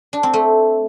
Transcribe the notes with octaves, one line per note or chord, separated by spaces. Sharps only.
D4
C4
A3